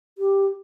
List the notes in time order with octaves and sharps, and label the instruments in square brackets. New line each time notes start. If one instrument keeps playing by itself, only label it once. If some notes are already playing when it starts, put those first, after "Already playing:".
[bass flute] G4